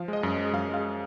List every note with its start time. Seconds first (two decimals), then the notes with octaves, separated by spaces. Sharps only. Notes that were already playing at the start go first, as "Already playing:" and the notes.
Already playing: F3 F5
0.08 G#3 D#5
0.23 F#2
0.38 G#3
0.53 F#2 F5
0.69 G#3 F5